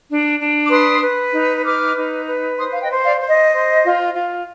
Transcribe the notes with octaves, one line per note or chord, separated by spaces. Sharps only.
D4
D4
D6
B4 C6 D#6
B4
D#4
B4 D6 F6
D#4
B4
C5 C6 D#6
F5
D#5 G5
C5
D5 F5
C5
D#5
C5
F4
F4